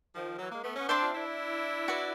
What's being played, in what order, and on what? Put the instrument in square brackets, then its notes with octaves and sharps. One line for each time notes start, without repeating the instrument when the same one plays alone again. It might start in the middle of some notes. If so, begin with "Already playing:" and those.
[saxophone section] D#3 F3
E3 F#3
G#3 A#3
A3 B3
B3 C#4
[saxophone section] C4 D4 [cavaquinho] C5 E5 A5 C6
[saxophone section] F4
D4 E4
[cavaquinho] F#4 B4 D5